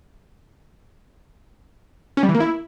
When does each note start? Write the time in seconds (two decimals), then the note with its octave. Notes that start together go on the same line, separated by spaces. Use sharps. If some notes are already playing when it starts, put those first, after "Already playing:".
2.17 C#4
2.23 G3
2.29 E3
2.35 A#3
2.40 E4